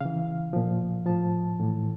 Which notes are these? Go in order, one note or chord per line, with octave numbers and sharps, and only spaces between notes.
C#3 E3 F5
A#2 F3
A2 F3 A5
A2 E3